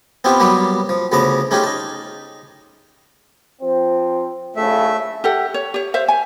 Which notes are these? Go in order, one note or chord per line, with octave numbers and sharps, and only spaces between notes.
B3 C4 E4 F4 G4
F#3 G3 A#3 B3 G4
F3
D2 C#3 F3 B3 A#5 D6
A3 C#4 D#4 F4 G4 G#4
D#4 A5
F3 C4
A#1 A2 C#3 A3 E5
G4 A4 F#5
C#5
G4 C#5
C5 E5 F5
G#5